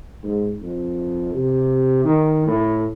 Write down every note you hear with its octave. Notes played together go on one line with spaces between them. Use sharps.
G#2
F2
C3
D#3
A2